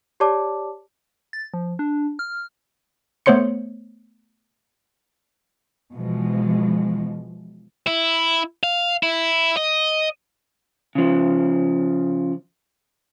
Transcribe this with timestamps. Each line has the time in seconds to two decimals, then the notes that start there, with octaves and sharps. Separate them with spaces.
0.20 G4 C#5 D5 A5 D6
1.33 A6
1.54 F3
1.79 D4
2.19 F6
3.26 A3 B3 C5 C#5 C6 C#7
5.93 B2 E3 F3 G#3
7.87 E4
8.64 F5
9.03 E4
9.57 D#5
10.95 C#3 F3